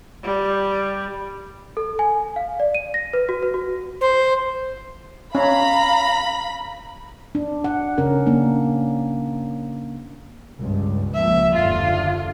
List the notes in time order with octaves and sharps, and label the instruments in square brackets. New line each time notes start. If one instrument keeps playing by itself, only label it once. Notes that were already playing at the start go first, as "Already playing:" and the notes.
[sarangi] G3
[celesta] A4
G#5
F5
D5
D#7
A#6
B4
F#4
B4
F#4
[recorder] C5
[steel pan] C#4 [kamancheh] F5 A#5 [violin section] B5
[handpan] D4
F#5
C#3 C#4 A#4
A#3 D4
[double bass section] C#2 G2
[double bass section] C#2 F3 A#3 [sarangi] E5
[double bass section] F#1 D#2 D3 [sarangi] F4